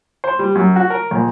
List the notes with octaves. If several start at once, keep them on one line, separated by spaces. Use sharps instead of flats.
C5
G3
F#2
F#4
A#4
A#1